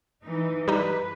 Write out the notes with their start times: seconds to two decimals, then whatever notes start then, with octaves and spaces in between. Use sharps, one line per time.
0.23 E3 D#4
0.68 G3 D#4 B4